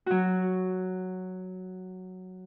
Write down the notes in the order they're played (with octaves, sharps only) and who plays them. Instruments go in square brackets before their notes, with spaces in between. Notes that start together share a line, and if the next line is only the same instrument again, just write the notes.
[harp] F#3 F#4